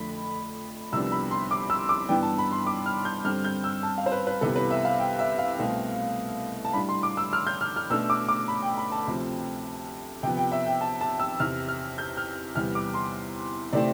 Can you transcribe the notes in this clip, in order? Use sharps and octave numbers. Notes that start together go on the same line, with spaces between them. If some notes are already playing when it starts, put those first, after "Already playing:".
Already playing: F2 D3 A3 D4 B5
C2 C3 F3 B3 D4 E6
B5
C6
D6
E6
D6
G2 E3 B3 D4 G5
A5
B5
C6
D6
F6
G6
G2 D3 G3 C4 F6
G6
E6
A5
F5
C5
B4
B4
C2 C3 E3 B3 A4
B4
E5
F5
G5
E5
F5
C2 B2 A3 C4
A5
A2 G3 D4 B5
C6
D6
E6
F6
G6
F6
F6
B2 A3 D4 E6
D6
D6
B5
G5
B5
A5
D2 C3 F3 C4
C3 F3 B3 G5
G5
E5
G5
A5
A5
E6
E2 C3 E3 F6
F6
G6
F6
E2 C3 G3 B3 F6
D6
C6
C3 E3 A3 C4 D5